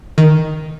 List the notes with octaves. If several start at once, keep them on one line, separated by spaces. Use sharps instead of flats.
D#3